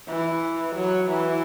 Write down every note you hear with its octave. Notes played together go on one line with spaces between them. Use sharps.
E3
F#3
E3